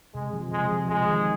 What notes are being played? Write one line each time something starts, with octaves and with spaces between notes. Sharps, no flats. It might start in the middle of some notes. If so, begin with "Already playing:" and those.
C3 G#3
F3
C3 G#3
F3
C3 G#3
D#3